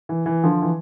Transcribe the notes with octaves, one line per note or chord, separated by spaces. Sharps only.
E3
E3
D3 F3
E3